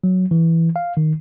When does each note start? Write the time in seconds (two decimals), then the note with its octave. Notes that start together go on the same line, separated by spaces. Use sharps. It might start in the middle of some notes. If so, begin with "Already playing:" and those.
0.04 F#3
0.31 E3
0.76 F5
0.97 D#3